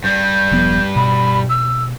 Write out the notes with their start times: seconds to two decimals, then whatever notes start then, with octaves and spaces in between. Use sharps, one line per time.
0.04 G2 G3 G6
0.51 E1 F3 B3
0.96 B2 B5
1.49 E6